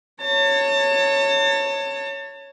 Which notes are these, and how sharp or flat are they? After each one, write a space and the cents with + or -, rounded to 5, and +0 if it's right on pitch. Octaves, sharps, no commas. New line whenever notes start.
C#5 +0 A5 +35